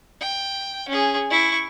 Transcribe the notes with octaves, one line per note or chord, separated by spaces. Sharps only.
G5
C#4 G#4
E4 C#6